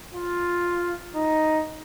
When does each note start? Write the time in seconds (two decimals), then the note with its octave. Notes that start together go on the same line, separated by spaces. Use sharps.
0.15 F4
1.15 D#4